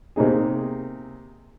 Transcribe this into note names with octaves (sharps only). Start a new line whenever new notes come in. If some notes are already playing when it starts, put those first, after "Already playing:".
C3 A#3 D#4 G#4